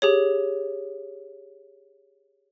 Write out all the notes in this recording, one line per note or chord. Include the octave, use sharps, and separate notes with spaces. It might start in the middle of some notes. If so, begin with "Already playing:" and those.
G4 G#4 C#5